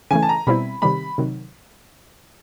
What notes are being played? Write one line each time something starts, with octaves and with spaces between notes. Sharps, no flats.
C#3 E3 A3 G#5
A5
A#5
B2 G3 C4 E4 B5
C3 D#3 G3 B5
C3 D#3 F#3